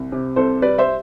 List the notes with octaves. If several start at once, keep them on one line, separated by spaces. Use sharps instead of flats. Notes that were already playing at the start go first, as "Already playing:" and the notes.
Already playing: C2
C3
C2 A4 C5
G3 B4 D5
C5 E5